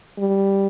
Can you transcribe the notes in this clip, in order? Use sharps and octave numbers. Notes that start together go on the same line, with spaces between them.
G3